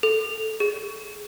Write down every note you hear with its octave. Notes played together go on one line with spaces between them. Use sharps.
A4
G#4